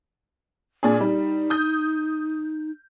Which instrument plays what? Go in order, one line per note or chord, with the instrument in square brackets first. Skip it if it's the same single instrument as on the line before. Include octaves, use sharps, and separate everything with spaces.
[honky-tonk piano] A#2 D4 G#4
[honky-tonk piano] G3 [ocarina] D#4
[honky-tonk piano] D#6 G6